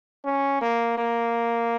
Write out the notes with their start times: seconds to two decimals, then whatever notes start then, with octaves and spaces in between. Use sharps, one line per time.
0.25 C#4
0.61 A#3
0.98 A#3